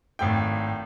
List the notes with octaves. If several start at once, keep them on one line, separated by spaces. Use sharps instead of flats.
G#1 A2 G5